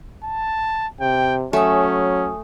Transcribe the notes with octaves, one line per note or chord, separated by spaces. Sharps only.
A5
C3 G5
F#3 A3 C#4 G#5 D#6